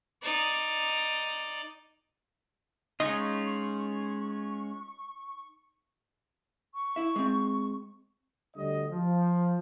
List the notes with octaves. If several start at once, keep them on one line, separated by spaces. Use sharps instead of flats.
D#4 D5
G#3 C#4 D#4 F4 D#5 C#6
C#6
E4 E5
G#3 C4
D2 D3 G3 D#5
F3